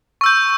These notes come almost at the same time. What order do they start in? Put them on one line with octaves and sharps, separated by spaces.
C#6 E6 G6